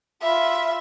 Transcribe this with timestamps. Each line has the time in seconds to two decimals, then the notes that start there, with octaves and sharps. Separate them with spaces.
0.22 F4 E5 B5